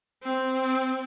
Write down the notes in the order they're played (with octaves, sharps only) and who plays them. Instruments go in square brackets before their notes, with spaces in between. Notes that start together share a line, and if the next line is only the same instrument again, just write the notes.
[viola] C4